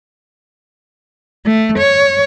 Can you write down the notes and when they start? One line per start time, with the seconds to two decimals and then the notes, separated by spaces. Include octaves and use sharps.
1.46 A3
1.78 C#5